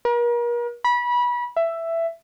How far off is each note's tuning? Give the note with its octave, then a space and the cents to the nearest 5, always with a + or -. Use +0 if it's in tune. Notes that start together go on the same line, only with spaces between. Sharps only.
A#4 +40
B5 -25
E5 +10